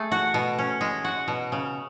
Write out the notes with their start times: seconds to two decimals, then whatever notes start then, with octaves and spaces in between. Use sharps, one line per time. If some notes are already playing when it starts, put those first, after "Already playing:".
Already playing: A3 G#4
0.12 F#4
0.34 B2
0.58 C#4
0.81 G#3
1.04 F#4
1.28 B2
1.52 C#3